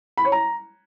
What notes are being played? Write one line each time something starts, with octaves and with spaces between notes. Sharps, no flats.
B5
C#5
A#5